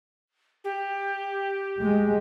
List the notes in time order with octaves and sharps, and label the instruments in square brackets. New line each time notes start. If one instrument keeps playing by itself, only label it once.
[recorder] G4
[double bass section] G#3